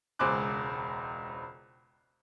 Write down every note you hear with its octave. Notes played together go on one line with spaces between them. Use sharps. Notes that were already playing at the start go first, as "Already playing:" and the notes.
E1 C#2 C5 G#5 D6 F#6